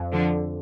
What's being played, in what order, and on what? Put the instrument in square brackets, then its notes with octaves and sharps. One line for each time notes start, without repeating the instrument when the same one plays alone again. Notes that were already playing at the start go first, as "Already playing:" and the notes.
Already playing: [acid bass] F2
[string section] D3 F3